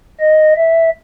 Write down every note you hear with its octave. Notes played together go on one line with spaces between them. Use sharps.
D#5
E5